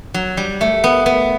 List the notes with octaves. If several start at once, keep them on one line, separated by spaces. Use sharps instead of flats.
F#3
G3
A3
B3
B3